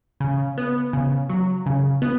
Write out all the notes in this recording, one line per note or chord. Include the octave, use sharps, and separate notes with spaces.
C#3
B3
C#3
F#3
C#3
B3